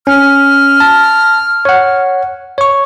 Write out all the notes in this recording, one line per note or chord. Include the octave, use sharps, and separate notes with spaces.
C#4 F6
A5
C#5 F#5
C#5 C#6